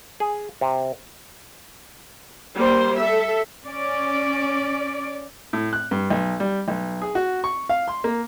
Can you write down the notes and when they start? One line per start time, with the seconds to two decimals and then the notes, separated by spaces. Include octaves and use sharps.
0.20 G#4
0.61 C3
2.55 G3 A#3 C5
2.97 A4 E5
3.64 C#4 D5
5.53 A2
5.73 F#6
5.91 G2
6.10 B1
6.40 G3
6.68 B1
7.02 G#4
7.15 F#4
7.44 C#6
7.69 F5
7.88 C6
8.04 A#3